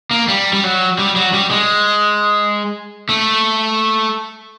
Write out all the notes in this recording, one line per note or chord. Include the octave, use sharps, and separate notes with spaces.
A#3
G3
G3
F#3
G3
F#3
G3
G#3
A3